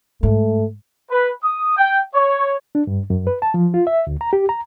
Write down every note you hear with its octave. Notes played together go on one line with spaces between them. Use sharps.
G#2 A3
B4
D#6
G5
C#5
D4
G2
F#2
B4
A5
F3
F4
E5
D2
A#5
G4
A#5